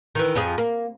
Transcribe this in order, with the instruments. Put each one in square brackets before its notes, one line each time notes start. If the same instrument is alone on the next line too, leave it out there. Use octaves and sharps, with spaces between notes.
[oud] D#3 E3
F2 F3 G#4
A#3